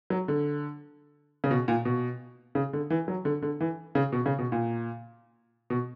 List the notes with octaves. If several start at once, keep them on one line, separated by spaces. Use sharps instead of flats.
F#3
D3
C#3
B2
A#2
B2
C#3
D3
E3
F#3
D3
D3
E3
C#3
B2
C#3
B2
A#2
B2